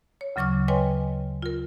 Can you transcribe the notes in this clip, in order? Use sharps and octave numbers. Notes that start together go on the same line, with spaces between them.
C#5
D2 C#3 F#3 C#6 D6 F6
B4 C#5 D#5 G5 G#5 C6
F4 A#4